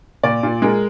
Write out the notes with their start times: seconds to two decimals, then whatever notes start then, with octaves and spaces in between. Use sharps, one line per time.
0.23 A#2 D5
0.43 A#2
0.62 G#3 A#4